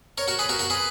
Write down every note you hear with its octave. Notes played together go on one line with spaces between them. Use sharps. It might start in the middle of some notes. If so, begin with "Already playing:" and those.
A#4 C#5
F#4 A#4
G#4 B4
F#4 A#4
F#4 A#4
G#4 B4